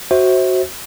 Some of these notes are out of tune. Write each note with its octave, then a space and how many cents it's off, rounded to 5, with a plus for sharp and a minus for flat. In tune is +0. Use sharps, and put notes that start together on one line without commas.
F#4 +5 C5 +15 E5 -25